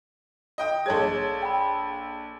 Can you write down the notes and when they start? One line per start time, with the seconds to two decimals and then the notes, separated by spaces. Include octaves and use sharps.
0.58 D#5 G5 D#6
0.86 A#1 G#4 A4 C#5 G#6
1.42 G5 B5